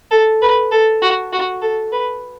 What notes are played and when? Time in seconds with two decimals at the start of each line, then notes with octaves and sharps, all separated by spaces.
0.11 A4
0.41 B4
0.71 A4
1.02 F#4
1.32 F#4
1.62 A4
1.92 B4